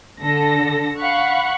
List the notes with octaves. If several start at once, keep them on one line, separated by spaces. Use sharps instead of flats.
D3 A4 A#6
F5 F#5 B5 C#6 F#6